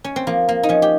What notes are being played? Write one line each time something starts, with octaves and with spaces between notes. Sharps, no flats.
C#4
C4
F3 A#3
A#3
D#4
F3 C#4
G4